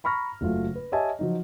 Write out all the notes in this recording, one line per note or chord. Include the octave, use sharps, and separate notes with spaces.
A#5 B5 C#6 F6 A#6
F#1 F#3 A3 F4
B4
G4 C#5 D#5 E5 G#5 A5
F3 F#3 D#4